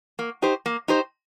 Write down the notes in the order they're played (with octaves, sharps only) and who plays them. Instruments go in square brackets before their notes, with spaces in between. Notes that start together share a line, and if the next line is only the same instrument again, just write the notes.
[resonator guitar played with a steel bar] A#3
D#4 G4 C5
A#3
D#4 G4 C5